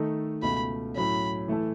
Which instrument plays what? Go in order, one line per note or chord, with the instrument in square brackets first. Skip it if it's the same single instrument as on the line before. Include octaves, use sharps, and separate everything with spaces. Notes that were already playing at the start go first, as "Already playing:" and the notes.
Already playing: [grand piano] D#3 A3 D#4 A4
[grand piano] C#2 B2 A3 [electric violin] B5
[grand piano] A2 F#3 C#4 [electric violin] B5
[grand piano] E3 A3 E4 A4